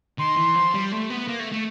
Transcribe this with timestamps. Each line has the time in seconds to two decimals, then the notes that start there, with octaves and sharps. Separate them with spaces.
0.19 D#3 C6
0.37 E3
0.55 F3
0.73 G3
0.92 A3
1.10 B3
1.28 A#3
1.39 A3
1.52 A3